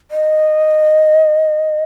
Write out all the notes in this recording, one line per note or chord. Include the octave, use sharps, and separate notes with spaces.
D#5